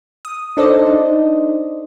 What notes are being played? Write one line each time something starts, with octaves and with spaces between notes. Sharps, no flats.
D#6
D4 D#4 A4 C5 D5 D#5
D4